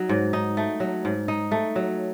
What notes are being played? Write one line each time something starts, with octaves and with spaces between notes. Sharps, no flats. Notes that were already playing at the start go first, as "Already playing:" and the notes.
Already playing: F#3 D#4
G#2
D#4
A3
F#3
G#2
D#4
A3
F#3